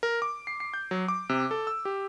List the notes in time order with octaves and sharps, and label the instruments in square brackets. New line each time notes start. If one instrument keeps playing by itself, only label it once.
[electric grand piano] A#4
D6
C7
C7
G6
F#3
D6
C3
A4
E6
G4